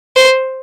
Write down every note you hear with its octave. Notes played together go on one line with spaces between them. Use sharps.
C5